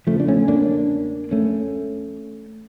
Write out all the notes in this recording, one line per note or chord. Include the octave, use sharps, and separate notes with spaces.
E2 C#3 F3 A3
D4
A3 C#4
A#3 D4
A3 C#4